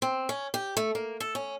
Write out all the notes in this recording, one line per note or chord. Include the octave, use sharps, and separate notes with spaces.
C4
C#4
G4
A3
A#3
A4
C#4